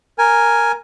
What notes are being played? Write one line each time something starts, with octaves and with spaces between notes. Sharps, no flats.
A#4 G#5